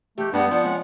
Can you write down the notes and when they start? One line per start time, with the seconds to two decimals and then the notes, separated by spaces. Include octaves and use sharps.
0.18 E3 G#3 A3 G4
0.33 G2 G#3 B3 D4 F#5
0.51 F3 D5 F#5 A5
0.64 G#3 C4 C#4 C#5